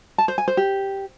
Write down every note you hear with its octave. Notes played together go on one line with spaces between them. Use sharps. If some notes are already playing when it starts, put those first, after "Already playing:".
A5
C5
G#5
C5
G4